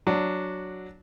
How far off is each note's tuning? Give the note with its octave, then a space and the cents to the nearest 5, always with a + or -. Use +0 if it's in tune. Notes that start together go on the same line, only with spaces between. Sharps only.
F#3 +0 D4 +0